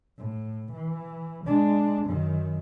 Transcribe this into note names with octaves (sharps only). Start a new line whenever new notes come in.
A2
E3
G#3 D4
F#2 D#3